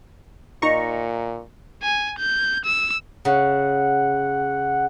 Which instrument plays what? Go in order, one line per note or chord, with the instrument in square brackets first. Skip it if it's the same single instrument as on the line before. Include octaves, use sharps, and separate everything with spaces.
[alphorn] A#2 [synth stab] D#4 A#5 C#6
[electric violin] G#5
G6
E6
[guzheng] C#3 [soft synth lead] F#5